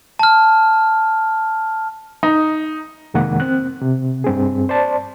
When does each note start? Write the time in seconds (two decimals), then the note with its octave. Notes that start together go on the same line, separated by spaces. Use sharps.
0.19 A5 F6
2.23 D#4
3.14 F2 C3 D#3 G#3 A#3 F#5
3.40 C4 F#6
3.82 C3
4.24 G2 C4 G#4
4.69 C5 D5 A5